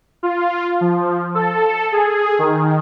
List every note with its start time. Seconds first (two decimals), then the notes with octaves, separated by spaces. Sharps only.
0.23 F4
0.81 F3
1.35 A4
1.92 G#4
2.39 D#3